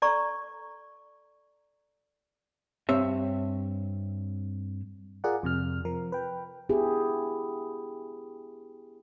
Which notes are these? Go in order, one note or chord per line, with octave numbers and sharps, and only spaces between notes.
A4 D5 A#5 C#6
G2 C4 C#5 E5
F4 G#4 A#4 D5 F#5
F2 C3 F6
F3 A#4
B4 G5
B3 D4 E4 G4 G#4